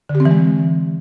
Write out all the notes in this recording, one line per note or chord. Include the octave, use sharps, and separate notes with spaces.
D3
G4
C4
E3
G#3